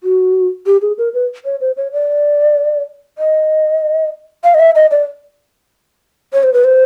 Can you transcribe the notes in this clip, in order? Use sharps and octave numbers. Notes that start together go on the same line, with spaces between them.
F#4
G4
G#4
A#4
B4
C#5
C5
C#5
D5
D#5
F5
D#5
E5
D#5
D5
C#5
C5
B4
C5